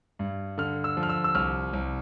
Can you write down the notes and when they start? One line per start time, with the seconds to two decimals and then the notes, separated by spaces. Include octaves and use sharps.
0.19 G2
0.58 D3 F6
0.84 E6
0.97 F3
1.03 F6
1.09 E6
1.24 E6
1.35 C2 F6
1.73 C2